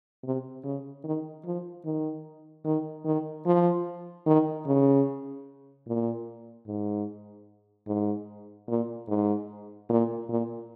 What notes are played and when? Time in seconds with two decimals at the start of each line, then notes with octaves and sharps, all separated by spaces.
0.24 C3
0.64 C#3
1.04 D#3
1.45 F3
1.85 D#3
2.65 D#3
3.05 D#3
3.46 F3
4.26 D#3
4.67 C#3
5.87 A#2
6.67 G#2
7.87 G#2
8.68 A#2
9.08 G#2
9.89 A#2
10.29 A#2